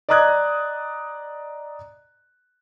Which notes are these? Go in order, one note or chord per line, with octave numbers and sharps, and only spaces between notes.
D5 D#5 A#5 D#6 F#6 G#6